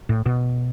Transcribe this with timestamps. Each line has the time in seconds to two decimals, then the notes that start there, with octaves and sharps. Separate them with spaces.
0.09 A2
0.26 B2